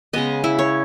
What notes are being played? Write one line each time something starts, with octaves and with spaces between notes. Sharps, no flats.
C#3 G#3 B3 D#5
E4
C#5